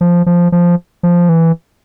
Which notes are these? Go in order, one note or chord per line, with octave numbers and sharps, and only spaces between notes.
F3
F3
F3
F3
E3